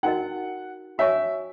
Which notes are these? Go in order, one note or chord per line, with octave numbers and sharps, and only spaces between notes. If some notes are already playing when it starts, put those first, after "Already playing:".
D#4 F#4 A#4 D#5 F#5
F#4 C#5 E5 G#5 C#6